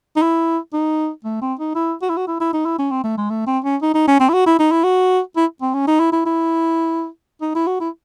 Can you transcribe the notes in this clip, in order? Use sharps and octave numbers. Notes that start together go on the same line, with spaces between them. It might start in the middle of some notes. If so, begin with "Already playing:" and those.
D#4
E4
D#4
A3
C4
D#4
E4
F#4
E4
F#4
E4
E4
D#4
E4
C#4
C4
A3
G#3
A3
C4
C#4
D#4
D#4
C#4
C4
E4
F#4
E4
D#4
E4
F#4
E4
C4
C#4
D#4
E4
E4
E4
D#4
E4
F#4
E4